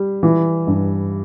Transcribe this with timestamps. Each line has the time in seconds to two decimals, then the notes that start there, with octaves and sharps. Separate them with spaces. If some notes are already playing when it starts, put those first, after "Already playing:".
Already playing: G3
0.23 E3
0.67 G2